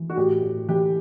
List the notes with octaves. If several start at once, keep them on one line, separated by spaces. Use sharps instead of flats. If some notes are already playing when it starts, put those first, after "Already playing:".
Already playing: E3
F#4
A2 G4
A2
E3 G4